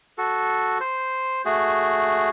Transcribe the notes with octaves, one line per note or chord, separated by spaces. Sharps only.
F#4 A4
C5
A3 F#4 G#4